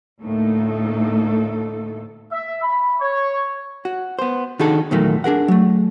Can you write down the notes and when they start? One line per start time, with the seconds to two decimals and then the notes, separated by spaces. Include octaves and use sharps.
0.21 D2 A2 A3 A#3 D#4 A4
2.32 E5
2.62 B5
3.00 C#5
3.85 F#4
4.19 B3 C5
4.59 D#3 D4 D#4 F#4 G#4 A4
4.91 E2 A#2 D#3 F#3 A3 A#3
5.24 D4 G#4 A#4 F#5
5.48 F#3 A3